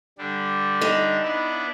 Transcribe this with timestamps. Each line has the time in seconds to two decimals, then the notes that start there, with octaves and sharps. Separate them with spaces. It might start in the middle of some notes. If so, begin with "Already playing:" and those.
0.18 D3 G3 D4
0.81 D#4 E5
1.23 B3 D4 E4